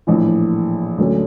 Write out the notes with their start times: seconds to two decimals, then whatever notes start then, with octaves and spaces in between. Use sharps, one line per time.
0.07 A#1 A2 E3
0.98 D2 D3 F#3 A3 C#4